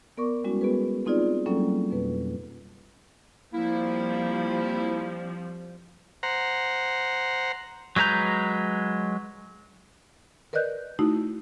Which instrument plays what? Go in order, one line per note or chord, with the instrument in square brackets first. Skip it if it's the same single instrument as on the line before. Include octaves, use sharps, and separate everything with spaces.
[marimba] B3 A#4 D5 C#6 D6
G3 G#3 C#4 E4 F#4
B3 F#4 G#4 B4
B3 C4 D#4 F4 G#4 D5
F#3 G3 A#3 C#4 E4 A4
F2 B2 B4
[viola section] F3 G3 C4 [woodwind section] A#3 E4
[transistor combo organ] C5 F#5 A#5
[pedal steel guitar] F#3 G#3 B4 A#5 G6
[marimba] A#4 B4 D5 D#5 F#6 G6
A3 D#4 E4 F#4